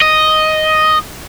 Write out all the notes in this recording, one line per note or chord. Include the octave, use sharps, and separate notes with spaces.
D#5